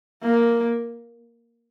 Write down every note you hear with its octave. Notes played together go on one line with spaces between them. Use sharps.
A#3